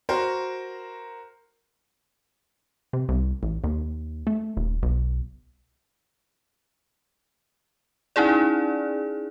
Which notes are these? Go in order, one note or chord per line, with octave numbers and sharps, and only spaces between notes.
F#4 A#4 C5
C3
C2
A1
D#2
A3
D#1
B1
C#4 D#4 E4 G#4 D5